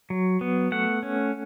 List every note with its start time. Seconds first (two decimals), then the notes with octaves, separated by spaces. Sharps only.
0.10 F#3
0.41 B3
0.72 A3 F#5
1.03 C#4